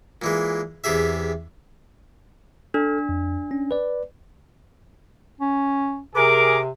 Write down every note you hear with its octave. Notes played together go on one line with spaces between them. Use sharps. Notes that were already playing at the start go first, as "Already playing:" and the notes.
A#2 E3 G#3
E2 C3 G4 G#4 E5
D4 A4 F6
F2
C#4
B4 D5
C#4
C3 G#4 A#4 D6